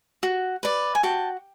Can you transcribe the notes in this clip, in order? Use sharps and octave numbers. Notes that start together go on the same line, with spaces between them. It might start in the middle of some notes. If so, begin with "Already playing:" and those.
F#4
B4 D5
G#5
F#4 G5 A5